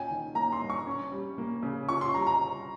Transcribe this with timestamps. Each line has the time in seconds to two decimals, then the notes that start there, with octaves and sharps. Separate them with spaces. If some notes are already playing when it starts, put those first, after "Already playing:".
Already playing: A#2 C#4 G5 G#5
0.11 D#3
0.35 A#3 A#5
0.52 C6
0.61 G2
0.70 C#6
0.87 C#4
1.12 G3
1.38 A#3
1.63 C#3
1.88 F4 C#6
2.01 C6
2.14 G3 A#5
2.27 A#5